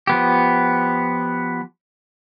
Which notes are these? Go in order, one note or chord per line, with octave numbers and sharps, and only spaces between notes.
F3 B3 G4